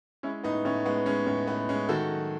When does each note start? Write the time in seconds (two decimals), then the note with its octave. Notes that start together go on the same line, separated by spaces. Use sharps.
0.23 G#3 C#4 E4
0.43 A2 B3 D#4
0.65 A2 C#4
0.85 G#3 B3
1.06 G#3 C#4
1.26 A2 C#4
1.47 A2 B3
1.69 G#3 C#4
1.89 D#3 F#4 A4
2.10 F#3